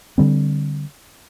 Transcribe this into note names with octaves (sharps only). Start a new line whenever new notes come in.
D3 G3 C4